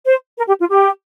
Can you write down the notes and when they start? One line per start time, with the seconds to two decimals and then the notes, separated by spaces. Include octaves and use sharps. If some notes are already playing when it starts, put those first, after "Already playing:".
0.05 C5
0.37 A#4
0.48 G4
0.58 F4
0.69 G4